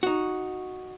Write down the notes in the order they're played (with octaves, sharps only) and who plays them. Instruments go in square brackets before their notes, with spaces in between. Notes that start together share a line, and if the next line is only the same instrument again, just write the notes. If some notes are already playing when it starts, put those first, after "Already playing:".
[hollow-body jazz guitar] D#4 F#4